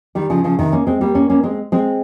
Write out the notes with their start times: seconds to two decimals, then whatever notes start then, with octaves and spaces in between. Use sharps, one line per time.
0.15 D#3 G3
0.30 C#3 F3
0.44 C#3 F3
0.59 C3 D#3
0.72 A#3 C#4
0.87 G#3 C4
1.01 G3 A#3
1.15 A#3 C#4
1.30 A#3 C#4
1.43 G#3 C4
1.72 G#3 C4